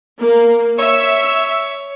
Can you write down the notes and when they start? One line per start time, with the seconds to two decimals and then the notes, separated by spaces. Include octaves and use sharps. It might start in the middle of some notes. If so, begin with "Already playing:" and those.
0.19 A#3
0.79 C#5 E5 E6